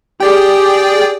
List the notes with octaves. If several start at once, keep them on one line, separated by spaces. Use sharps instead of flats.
G4 G#4 D5 G5